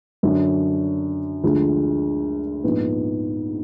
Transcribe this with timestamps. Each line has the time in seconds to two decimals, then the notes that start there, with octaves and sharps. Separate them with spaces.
0.23 F#2 D3 F#3 D4
1.44 D2 D3 F3 G#3
2.64 A#1 G#2 F3 B3